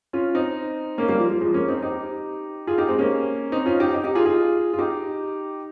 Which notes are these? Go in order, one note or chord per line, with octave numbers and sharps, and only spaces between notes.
C#4 F4
C4 D#4
A#3 C#4
G3 A#3
F3
F3
F3 G#3
A#3 C#4
C4 D#4
D#4 G4
F4 G#4
D#4 G4
G#3 C4
A#3 C#4
C4 D#4
C#4 F4
D#4 G4
D#4 G4
D#4 G4
F4 G#4
F4 G#4
F4
D#4 G4